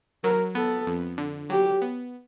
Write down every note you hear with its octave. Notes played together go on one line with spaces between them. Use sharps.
F#3 A#4
B3 A4
F2
D3
F#3 G4
B3